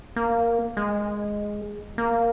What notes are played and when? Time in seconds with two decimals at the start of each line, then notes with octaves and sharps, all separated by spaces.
0.16 A#3
0.77 G#3
1.98 A#3